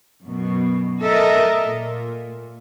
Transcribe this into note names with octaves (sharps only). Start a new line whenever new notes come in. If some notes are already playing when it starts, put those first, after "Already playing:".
F#2 B2
A4 A#4 D#5 E5
A#2